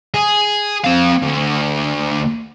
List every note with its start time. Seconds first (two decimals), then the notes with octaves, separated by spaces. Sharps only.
0.14 G#4
0.84 C4 F5
1.22 D2